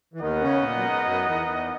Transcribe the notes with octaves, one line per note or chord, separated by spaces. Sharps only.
E3
D#2 D#3 B3 D#4 A#4 D#5 F#5
C#3 C#4
A#2 A#3
F#3
G#2 G#3
F#2 F#3
E2 E3
E2 E3